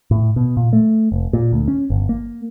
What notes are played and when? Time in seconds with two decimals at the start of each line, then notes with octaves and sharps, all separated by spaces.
0.11 A2
0.36 B2
0.57 A#2
0.73 A3
1.12 F1
1.33 A#2
1.53 D2
1.68 C#4
1.90 G1
2.09 A#3